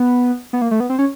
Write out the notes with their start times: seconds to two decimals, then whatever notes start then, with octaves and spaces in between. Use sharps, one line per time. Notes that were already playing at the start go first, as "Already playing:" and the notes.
Already playing: B3
0.53 B3
0.62 A#3
0.71 A3
0.80 B3
0.90 C4
0.99 C#4